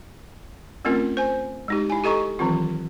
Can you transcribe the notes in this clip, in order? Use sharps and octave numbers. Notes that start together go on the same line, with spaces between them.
A3 C4 C#4 F4 A#4
C5 G#5
G#3 D#4 G4
E4 G#5
G4 A4 D#5 A#5 C#6
D#3 E3 F#3 C4 F4